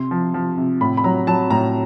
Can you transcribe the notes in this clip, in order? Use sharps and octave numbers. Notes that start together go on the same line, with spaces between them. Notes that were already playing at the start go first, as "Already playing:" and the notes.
Already playing: C3 C6
F3
F3
C3
A2 B5
B5
F#3 A#5
F#3 A5
A2 A#5